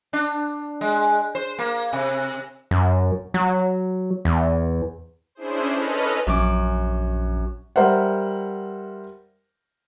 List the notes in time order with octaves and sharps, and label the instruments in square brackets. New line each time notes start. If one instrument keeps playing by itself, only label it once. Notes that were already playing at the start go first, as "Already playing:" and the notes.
[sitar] D4
G#3
C5
A#3
C3
[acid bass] F#2
F#3
E2
[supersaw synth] C#4 D4 E4 G#4 C5
C#4 A4 B4 D#5 F6
[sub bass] A#1 [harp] F#2 C#4 D6
[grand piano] G3 A#4 C5 E5 F#5